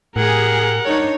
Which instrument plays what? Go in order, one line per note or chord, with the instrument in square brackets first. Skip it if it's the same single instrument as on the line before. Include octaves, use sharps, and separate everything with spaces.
[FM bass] A2 [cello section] G4 G#4 [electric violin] A#4 F#5
[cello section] D4 D#4 C#5